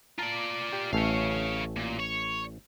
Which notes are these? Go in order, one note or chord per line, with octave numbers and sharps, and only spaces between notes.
F4 D5 A5 A#5
G4
A1 A3 C#4 C#5 F5
A#2
C#5